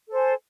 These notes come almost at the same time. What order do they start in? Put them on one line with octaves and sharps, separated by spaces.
A4 C5 G#5